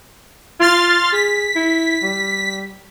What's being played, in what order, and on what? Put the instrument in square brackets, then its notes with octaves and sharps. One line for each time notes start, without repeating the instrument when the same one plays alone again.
[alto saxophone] F4 [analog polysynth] C6 F6 A6
[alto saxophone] G#4 [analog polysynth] B6
[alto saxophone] E4
G3